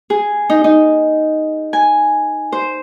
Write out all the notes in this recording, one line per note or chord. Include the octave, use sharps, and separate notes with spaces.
G#4
D#4
D#4
G#5
C5